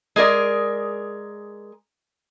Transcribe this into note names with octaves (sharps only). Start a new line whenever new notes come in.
G#3 G#4 A#4 D5